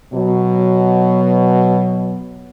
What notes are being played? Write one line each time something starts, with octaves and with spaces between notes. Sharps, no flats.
B2 F#3